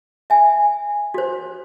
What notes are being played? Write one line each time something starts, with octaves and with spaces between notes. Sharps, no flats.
E5 G#5
F#4 C5